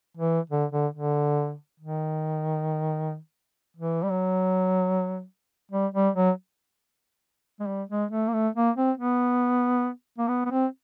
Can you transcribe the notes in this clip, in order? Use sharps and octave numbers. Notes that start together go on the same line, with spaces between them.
E3
D3
D3
D3
D#3
E3
G3
F#3
G3
G3
F#3
G#3
G3
G#3
A3
A#3
A3
A#3
C4
B3
A#3
B3
B3
C4